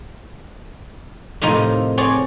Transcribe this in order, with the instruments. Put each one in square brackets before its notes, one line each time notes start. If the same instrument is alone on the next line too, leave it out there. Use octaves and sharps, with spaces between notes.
[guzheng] F2 A2 C3 D#4 F4 A#4
C4 G#4 C#5 D5